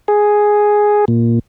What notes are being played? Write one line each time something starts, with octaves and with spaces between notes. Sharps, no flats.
G#4
A#2